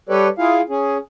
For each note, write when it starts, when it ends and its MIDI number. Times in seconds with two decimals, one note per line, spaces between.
0.09 0.28 55
0.09 0.28 67
0.09 0.28 69
0.09 0.28 71
0.09 0.28 73
0.09 0.28 74
0.38 0.61 64
0.38 0.61 65
0.38 0.61 68
0.38 0.61 77
0.69 0.98 61
0.69 0.98 68